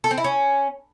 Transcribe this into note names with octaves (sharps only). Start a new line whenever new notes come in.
A4
C4
E4
C#4